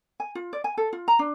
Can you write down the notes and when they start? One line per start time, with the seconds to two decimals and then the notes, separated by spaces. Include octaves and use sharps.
0.20 G#5
0.35 F4
0.53 D5
0.64 G#5
0.78 A4
0.93 F4
1.08 A#5
1.19 D4